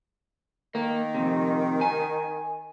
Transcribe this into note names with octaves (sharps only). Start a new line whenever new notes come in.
D#3 A#3
F2 C3
G#5